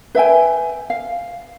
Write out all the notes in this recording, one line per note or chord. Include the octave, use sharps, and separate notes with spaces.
B4 E5 G5 G#5
F5